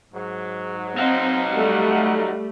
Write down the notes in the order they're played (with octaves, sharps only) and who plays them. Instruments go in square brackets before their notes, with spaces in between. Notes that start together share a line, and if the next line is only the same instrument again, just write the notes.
[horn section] G#2 F#3
[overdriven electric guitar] F#3 D#4 [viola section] C4 [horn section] D#5 F5 F#5
[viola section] G3 A3